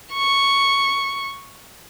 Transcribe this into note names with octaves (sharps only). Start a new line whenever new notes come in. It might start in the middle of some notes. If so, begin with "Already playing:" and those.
C#6